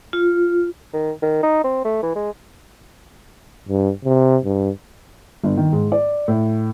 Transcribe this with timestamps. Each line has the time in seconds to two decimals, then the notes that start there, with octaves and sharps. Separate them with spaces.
0.13 F4
0.93 D#3
1.22 D#3
1.43 D#4
1.64 C4
1.85 A3
2.03 E3
2.16 G#3
3.69 G2
4.05 C3
4.44 G2
5.43 G1
5.57 D#3
5.73 G#2
5.92 D5
6.28 A2